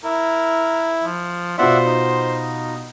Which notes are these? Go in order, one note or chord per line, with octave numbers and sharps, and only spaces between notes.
E4 A#4
F3
B2 B3 F4 C5 D5 E5 F#5
D#4